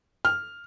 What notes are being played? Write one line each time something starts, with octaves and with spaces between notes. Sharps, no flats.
F6